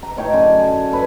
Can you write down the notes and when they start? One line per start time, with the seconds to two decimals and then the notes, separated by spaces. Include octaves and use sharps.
0.03 A#5
0.17 A2 D#4 C#5 G5
0.33 F#2 D3 G#5 D6
0.60 G#5
0.91 A4 B4 C#5